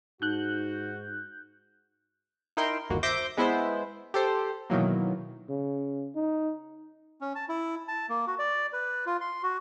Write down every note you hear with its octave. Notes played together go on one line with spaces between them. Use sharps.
G#2 D#4 F#4 F#6 G6
D#4 E4 A#4 G5 C6
G1 D#2 A#3 F#4
C5 E5 C6 D6 G6 A#6
G#3 B3 E4 C5
G4 A4 C5
B2 D#3 E3 F#3 A#3
C#3
D#4
C#4
A5
E4
A5
A#3
F#4
D5
B4
F4
C6
F#4